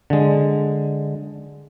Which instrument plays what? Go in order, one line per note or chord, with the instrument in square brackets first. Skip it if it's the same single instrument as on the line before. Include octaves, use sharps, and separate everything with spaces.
[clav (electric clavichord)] D3 G#3